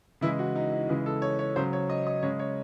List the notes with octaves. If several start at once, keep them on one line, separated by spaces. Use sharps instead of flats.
C#3 E3 G#3 E4
F#4
D#4
D#4
C#3 E3 G#3
A4
C#5
C#5
C#3 F#3 C5
C#5
D#5
D#5
C#3 G#3 C#5
C#5